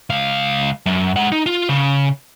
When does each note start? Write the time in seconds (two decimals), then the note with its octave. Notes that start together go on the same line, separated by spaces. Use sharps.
0.10 C#2 F5
0.86 F#2
1.16 G#3 F#5
1.32 D#4
1.46 F4
1.69 C#3